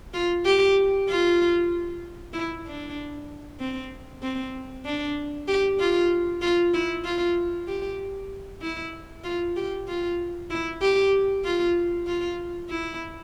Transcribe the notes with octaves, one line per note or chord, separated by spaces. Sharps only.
F4
G4
F4
E4
D4
C4
C4
D4
G4
F4
F4
E4
F4
G4
E4
F4
G4
F4
E4
G4
F4
F4
E4